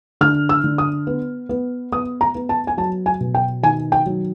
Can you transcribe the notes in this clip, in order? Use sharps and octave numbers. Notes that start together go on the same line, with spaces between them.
D3 F6
E6
D3
D#6
B3
B3
B3 D#6
A#5
B3
A5
G#5
F#3 A5
G#5
B2
G5
D#3 G#5
G5
F#3